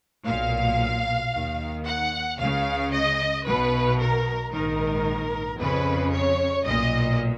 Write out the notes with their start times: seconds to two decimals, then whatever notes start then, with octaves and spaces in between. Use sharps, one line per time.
0.26 B1 A#2 F5
1.32 D#2 D#3
1.86 F#5
2.39 C#2 C#3 F5
2.92 D#5
3.45 B1 B2 B4
3.99 A#4
4.52 A#1 G#2 D#3 A#4
5.59 F2 C#3 B4
6.12 C#5
6.66 B1 A#2 D#5